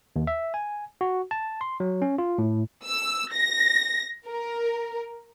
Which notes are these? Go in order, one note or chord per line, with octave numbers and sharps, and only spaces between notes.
D#2
E5
G#5
F#4
A5
C6
F#3
C#4
F4
A2
E6
A#6
A#4